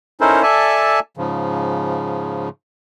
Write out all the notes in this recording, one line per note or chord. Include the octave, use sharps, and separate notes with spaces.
C#4 D#4 E4 A4 A#4 C5
A4 D5 E5 G#5 A5
G#2 C#3 F3